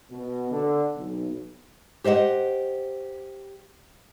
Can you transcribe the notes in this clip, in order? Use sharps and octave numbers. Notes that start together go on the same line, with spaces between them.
B2
D3
B1
G4 C5 D#5 E5 F#5